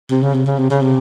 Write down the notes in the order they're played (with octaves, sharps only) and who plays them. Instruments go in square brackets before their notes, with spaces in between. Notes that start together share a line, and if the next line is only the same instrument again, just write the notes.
[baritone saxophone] C3
C#3
C3
C#3
C3
C#3
C3